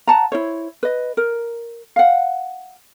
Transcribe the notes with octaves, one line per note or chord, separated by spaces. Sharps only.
F#5 A5 A#5
E4 C5 C#5
B4 D#5
A#4
F5 F#5